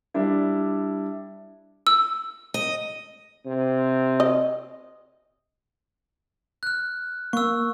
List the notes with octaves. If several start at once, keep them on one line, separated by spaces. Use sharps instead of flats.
G3 D4 E4
E6
D#5
C3
D#5
F6 F#6
A#3 C#6 E6